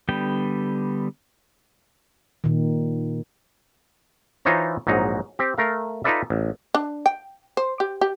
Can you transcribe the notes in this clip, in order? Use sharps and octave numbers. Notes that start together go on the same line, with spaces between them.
D3 G3 B3 G5
A#2 D#3
E3 D#4 F4 C5 C#5 A#5
A#1 G#2 F#3 D#4
C4 G4
A3 A#4 F5
D#4 F4 A4 B4 D5 E5
A1
D4
G5
C5
G4
G4